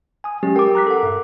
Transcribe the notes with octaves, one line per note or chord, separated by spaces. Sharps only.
G#5 D#6
F#3 G#3 C#4 G4
A#4 G5 D6
A#5 F#6 B6
A4 F#5
G2